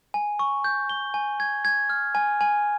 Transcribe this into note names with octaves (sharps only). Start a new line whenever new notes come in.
G#5
C#6
G6
G7
G#5
G#6
G#6
F6
G#5
G#5